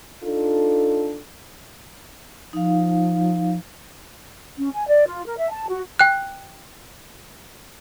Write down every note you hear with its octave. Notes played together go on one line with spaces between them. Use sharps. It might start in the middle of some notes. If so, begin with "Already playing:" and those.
D4 D#4 F4 A4
F3 D#4 F5
C#4
G#5
D5
F4
A#4
E5
A5
F#4
G5 F#6